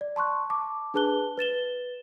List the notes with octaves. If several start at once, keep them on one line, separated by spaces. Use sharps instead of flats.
D5
A5 C6 C#6 F#6
A5 D6
D4 G#4 B4 A5 F#6 G7
B4 A6 E7 G7